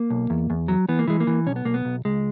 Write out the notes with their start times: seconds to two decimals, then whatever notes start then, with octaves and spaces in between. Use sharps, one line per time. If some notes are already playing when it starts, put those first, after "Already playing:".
Already playing: A#3
0.10 B1
0.30 E2
0.50 E2
0.68 F#3
0.89 E3 B3
0.99 A#3
1.07 E3 G#3
1.20 A#3
1.27 E3
1.46 B1 C#4
1.56 B3
1.65 B1 A#3
1.74 B3
1.85 B1
2.05 C#2 G#3